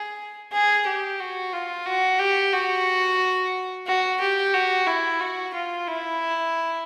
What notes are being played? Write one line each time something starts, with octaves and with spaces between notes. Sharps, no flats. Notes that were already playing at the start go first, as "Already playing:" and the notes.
Already playing: G#4
G#4
G4
F#4
F4
F#4
G4
F#4
F#4
G4
F#4
E4
F#4
F4
E4